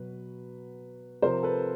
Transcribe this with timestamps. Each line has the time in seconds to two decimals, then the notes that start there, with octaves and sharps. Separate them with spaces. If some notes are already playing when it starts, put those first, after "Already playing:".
Already playing: B2 F#3 B4
1.22 C3 F3 A#4 C5
1.43 A4 B4